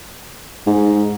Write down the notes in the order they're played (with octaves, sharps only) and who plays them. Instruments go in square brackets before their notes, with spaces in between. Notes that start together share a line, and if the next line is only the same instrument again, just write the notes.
[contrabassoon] G#2